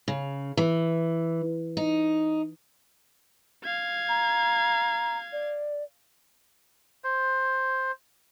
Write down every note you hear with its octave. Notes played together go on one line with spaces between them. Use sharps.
C#3
E3
D#4
F5 G#6
A#5
D5
C5